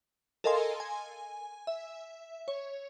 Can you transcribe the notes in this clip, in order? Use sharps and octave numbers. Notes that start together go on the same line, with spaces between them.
A4 A#4 D#5 F5 G#5 C6
G#5
E5
C#5